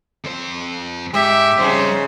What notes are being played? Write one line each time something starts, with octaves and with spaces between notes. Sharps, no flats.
F2 C5
G#2 G4 E5
F2 G#2 C#3 G3 C5